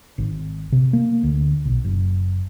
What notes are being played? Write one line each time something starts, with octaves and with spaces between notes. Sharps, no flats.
G#1
C3
A#3
D2
B1
F#1